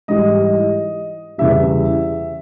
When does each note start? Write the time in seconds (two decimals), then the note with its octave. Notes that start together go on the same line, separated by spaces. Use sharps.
0.08 G#2 E3 G3 D#5
1.38 E2 C#3 E3 G3 E5